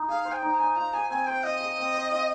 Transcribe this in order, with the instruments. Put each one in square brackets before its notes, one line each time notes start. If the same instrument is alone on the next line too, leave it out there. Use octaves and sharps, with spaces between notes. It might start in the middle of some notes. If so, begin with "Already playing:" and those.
Already playing: [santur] D#4
[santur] G#4 [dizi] F5
[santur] C5
[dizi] G#5
G5
[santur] D#4
[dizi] A#5
[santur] D#4 [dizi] G#5
[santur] F4 [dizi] A#5
[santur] G#4 [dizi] G#5
[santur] C4 [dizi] G#5
[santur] C5 [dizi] G5
[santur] F4 [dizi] D#5
[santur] G#4
C4
C5
F4